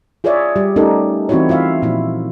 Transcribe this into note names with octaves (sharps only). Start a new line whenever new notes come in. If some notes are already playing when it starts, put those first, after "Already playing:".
F4 G#4 B4 C#5 D5 E5
G3 G4
A3 C#4 D#4 G4 A4 A#4
E3 C4 D#4 E4 F#4 C#5
E4 F4 E5 F5
A#2 F3 E4